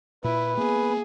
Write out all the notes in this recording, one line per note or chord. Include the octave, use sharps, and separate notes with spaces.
A#2 E4 B4
A#3 B3 G#4